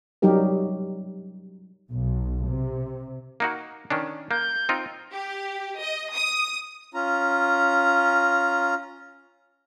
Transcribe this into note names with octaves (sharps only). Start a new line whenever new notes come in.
F#3 G3 D#4 G4 A#4
B1
C3
A#3 D#4 F#4
D#3 C#4 D4
A#3 G6
C4 D#4 F4
G4
D#5
D#6
C#4 F4 A#5